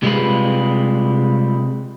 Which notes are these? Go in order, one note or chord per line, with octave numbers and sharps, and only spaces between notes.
C3 G3 G#3 F4 B4